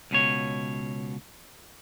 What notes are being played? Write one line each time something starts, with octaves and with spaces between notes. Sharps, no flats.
C#2 B2 C#5